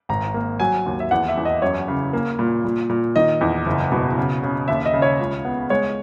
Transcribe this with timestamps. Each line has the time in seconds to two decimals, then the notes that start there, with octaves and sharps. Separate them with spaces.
0.09 G#1 A#5
0.34 A#3
0.60 F#3 G#5
0.86 D#2
1.00 E5
1.11 E2 F#5
1.28 E5
1.37 E2
1.45 D#5
1.62 F#2 C#5
1.88 C#3
2.13 A#3
2.39 A#2
2.65 A#2
2.90 A#2
3.16 D#3 D#5
3.41 E2
3.66 F#1
3.92 B2
4.17 C#3
4.43 C#3
4.68 D#2 E5
4.86 D#5
4.94 C#3
5.02 C#5
5.19 C#2
5.45 B3
5.70 G#3 C#5